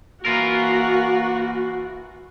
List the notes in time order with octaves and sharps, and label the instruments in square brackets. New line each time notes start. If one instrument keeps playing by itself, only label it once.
[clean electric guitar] E3 F4 A#4 [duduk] A#3 [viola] F#4